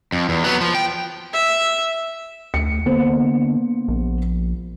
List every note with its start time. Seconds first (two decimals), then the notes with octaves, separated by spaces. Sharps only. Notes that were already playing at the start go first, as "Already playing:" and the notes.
0.12 F2
0.29 E2
0.44 F#3 B3
0.61 F3
0.75 G5
1.33 E5
2.54 D2 C#7
2.86 D3 A#3 B3 C5
3.88 A#1